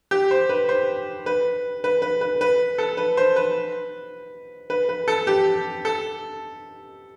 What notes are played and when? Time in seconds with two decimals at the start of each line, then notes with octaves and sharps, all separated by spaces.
0.11 G4
0.31 C5
0.49 B4
0.69 C5
1.26 B4
1.84 B4
2.02 B4
2.21 B4
2.41 B4
2.78 A4
2.97 B4
3.17 C5
3.36 B4
4.70 B4
4.89 B4
5.08 A4
5.27 G4
5.85 A4